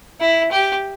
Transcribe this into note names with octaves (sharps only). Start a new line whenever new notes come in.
E4
G4